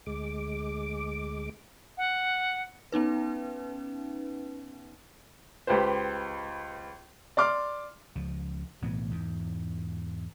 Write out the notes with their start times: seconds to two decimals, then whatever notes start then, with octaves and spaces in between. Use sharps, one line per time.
0.06 D2 G#3 D6
1.98 F#5
2.92 B3 C#4 D#4 B4
5.67 C#2 G4 B4 C5
7.37 D5 C6 D6 F6
8.15 C#2 F3
8.82 B1 A2 E3 B3
9.11 E2 G#2